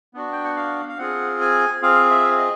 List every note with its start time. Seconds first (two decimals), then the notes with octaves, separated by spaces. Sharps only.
0.14 B3 D4 F#4
0.32 G5
0.44 F#5
0.57 F5
0.89 F5
0.98 C4 F4 G#4 F#5
1.41 G#5
1.82 C4 F4 G#4 F5
2.11 E5
2.38 D#5